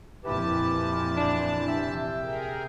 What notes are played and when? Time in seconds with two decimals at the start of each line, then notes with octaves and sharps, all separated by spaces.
0.24 F2 A#2 E3 E4 G4 B4 A5
1.17 D4
1.68 C3 E5 G5
2.20 G#4 A#4